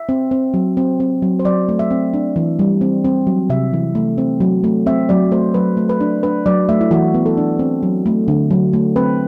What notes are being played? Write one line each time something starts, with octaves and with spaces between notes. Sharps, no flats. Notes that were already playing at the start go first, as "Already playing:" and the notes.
Already playing: E5
C4
C4
F#3
C4
C4
F#3
C5
F#3 D5
A3
E5
C4
D4
E3
G3
C4
C4
F#3
C3 E5
E3
A3
C4
F#3
A3
C4 E5
F#3 D5
A3 C5
F#3 B4
A3
B4
D4
D4 B4
F#3 D5
A3 E5
E4
E3 F#4
B3
A4
D4
C4
F#3
A3
D3
F#3
A3
C4 B4